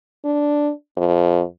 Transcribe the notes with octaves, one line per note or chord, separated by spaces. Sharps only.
D4
F2